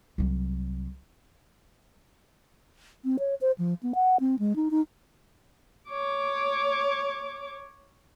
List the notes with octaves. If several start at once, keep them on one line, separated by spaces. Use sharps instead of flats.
C2 F#3
C4
C#5
C5
F3
B3
F#5
C4
G#3
D#4
D#4
C#5 D6